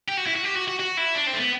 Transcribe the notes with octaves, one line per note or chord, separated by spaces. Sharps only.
G4
F#4
E4
F#4
G4
F#4
F#4
F#4
E4
D4
C4
A3
B3